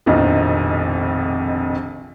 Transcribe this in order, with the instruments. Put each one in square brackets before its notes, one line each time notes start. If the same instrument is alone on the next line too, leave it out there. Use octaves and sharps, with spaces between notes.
[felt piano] F1 A#1 F2 B2 D#3 F3